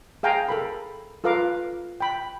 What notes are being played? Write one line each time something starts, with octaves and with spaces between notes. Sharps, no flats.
G#4 F5 G5 G#5 A#5
A4 A#4 B5
F4 A4 B4 F5 A#5 D6
G5 B5